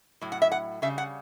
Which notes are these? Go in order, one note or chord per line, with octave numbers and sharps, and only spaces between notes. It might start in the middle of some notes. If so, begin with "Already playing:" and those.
A2 F#3
F#5
E5
F#5
C#3 G3 E5
F#5